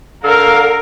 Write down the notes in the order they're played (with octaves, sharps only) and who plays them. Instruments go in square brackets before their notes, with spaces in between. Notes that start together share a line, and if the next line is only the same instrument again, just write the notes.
[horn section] D3 A4 F5 [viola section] A#4